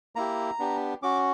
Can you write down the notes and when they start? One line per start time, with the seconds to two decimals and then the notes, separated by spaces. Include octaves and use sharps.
0.16 A#3 E4 G4 A#5
0.59 B3 D4 G4
1.02 C#4 F#4 D6